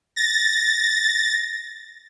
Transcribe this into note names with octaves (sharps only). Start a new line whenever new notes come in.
A6 A#6